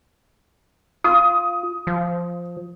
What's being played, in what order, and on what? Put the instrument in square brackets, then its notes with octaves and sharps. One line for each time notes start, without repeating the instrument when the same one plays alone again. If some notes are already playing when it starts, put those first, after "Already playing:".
[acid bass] F4 [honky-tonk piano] D#6
[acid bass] F3